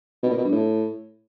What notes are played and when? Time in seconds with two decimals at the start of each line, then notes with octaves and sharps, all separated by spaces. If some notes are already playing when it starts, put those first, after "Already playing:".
0.23 B2
0.30 A#2
0.37 B2
0.45 G2
0.52 A2